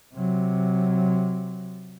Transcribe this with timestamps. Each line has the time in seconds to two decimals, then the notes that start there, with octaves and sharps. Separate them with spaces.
0.14 C3 F#3